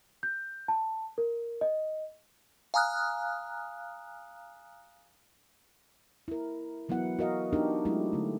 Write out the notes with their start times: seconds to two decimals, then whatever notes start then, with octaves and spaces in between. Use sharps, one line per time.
0.23 G6
0.68 A5
1.18 A#4
1.61 D#5
2.74 F5 G#5 A#5 D#6 F6 F#6
6.28 E4 A#4
6.89 E3 F#3 B3 E4 F#5
7.19 F#4 A#4 D#5 F5
7.53 B3 D4 D#4 G4 A#4
7.85 F#3 G#3 A3 D4 E4 G4
8.13 D3 A3